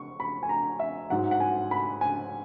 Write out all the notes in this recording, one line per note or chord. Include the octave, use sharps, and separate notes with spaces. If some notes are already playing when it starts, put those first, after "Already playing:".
Already playing: C#6
B5
G#5
A#5
E5
G#2 F#3 F#5
F#5
G#5
B5
G#5